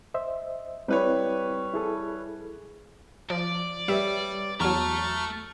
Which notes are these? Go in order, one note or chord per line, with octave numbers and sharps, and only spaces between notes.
C5 D#5 E5
G3 C4 E4 B4 C#5
E4 G#4 A4
F3 D5
G3 G4 B4 C#5 E5
E2 F#3 A3 A5 A#5 C#6 F6